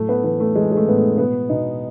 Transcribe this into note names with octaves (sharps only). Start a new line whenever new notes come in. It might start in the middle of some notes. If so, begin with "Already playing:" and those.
Already playing: A2 F#3 A3
B3
E3 B3
A3
E3 G#3
G#3
A3
A2 B3
A3
B2 B3
B2 D#4